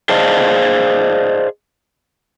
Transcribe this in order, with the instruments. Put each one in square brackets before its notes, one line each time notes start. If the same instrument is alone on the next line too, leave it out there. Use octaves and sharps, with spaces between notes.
[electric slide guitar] G#4 C5 D5 D#5 F5 A5